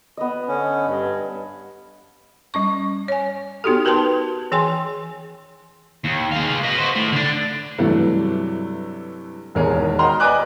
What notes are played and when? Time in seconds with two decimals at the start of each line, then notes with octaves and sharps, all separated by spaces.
0.17 B3 D#5
0.48 D3 C#4
0.87 G2
2.54 G3 C#4 C#6
3.08 C#5 G#5
3.64 B3 D#4 F#4 G4 A4
3.85 F#4 A#4 B4 G5 A5 C6
4.52 E3 G#4 G5 G#5 C6
6.05 D#2
6.33 G#3 F5
6.64 B4 D#5
6.78 F#4 C5
6.96 A2
7.13 D3 D4
7.78 G2 C3 E3 F#3 A3
9.55 E1 D#2 G#4 A#4 C#5
9.99 F#4 D#5 G5 A#5 C6 F6
10.20 B4 D5 D#5 G#5 D6 F#6